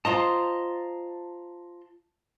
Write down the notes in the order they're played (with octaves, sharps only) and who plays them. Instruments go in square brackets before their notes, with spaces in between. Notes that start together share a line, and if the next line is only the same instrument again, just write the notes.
[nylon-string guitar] F4 C5 D#5 [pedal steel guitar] A5 A#5 C6